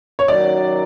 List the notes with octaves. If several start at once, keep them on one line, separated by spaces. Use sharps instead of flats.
C#5
F#2 D#3 F#3 D5